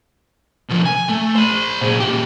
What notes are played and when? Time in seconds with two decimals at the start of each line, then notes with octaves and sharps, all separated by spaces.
0.69 B2 F3
0.85 G#5
1.09 A3
1.35 C5 B5
1.81 A#2 G#4
2.00 A#2 G4